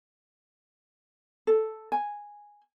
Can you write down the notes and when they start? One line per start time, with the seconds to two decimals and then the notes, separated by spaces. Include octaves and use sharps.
1.47 A4
1.92 G#5